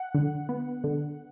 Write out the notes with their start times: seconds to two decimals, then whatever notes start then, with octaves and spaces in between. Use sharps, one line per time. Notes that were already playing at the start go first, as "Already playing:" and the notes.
Already playing: F#5
0.15 D3
0.49 B3
0.84 D3